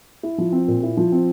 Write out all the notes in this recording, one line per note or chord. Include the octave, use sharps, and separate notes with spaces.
E4
F3
C4
A#2
E4
F3
C4